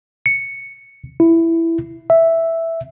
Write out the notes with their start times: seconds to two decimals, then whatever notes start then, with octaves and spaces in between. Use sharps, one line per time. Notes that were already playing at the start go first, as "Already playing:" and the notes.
0.26 C#7
1.20 E4
2.10 E5